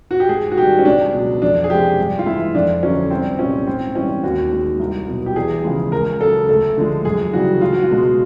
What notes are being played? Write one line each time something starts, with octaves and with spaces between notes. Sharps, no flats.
F#4
G4
G#2 G#4
F#4
D#3 G4
G3
C#4
C#2 D4
B2 F#3
F2 D4
G#4
C3 F3 G#3 G4
G2
F4
E3 G#3 E4
F2 D4
D3 F#3 C#4
C2 C4
A#2 G3 C#4
G#2 C4
E3 G3 C#4
D#2 F#4
D#3 G#3
C2
B2 F#3
G4
E2 G#4
C#3 F3 G#3
C#2 A#4
C#3 F#3 A4
D2 A4
D3 F3 G#3
F#2 G#4
C#3 E3 G3 F#4
C#2 F4
F#4
F4
B2 G#3